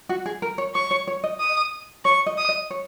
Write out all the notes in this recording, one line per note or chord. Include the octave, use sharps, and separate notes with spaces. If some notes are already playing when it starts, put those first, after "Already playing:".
F#4
G#4
A#4
C#5
C#5 C#6
C#5
C#5
D#5
D#6
C#5 C#6
D#5
D#6
D#5
C#5